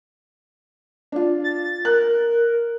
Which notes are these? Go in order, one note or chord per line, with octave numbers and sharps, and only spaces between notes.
D4 F4
A6
A#4 F#6